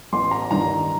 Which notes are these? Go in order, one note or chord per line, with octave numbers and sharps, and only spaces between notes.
A1 C6
A#5
G2 D#3 A#5